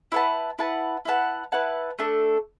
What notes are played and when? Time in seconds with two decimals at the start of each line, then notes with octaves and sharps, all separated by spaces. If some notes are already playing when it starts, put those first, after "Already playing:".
0.12 E4 B4 F#5 A5
0.59 E4 B4 F#5 A5
1.05 E4 B4 F#5 A5
1.52 E4 B4 F#5 A5
1.99 A3 D4 A4